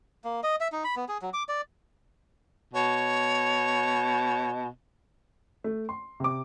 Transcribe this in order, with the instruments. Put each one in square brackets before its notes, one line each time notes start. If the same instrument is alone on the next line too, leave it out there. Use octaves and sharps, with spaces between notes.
[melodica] A#3
D#5
E5
D#4
B5
B3
G#4
F#3
D6
D5
[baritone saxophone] B2 [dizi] C#5
[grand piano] A3
C6
C3 D6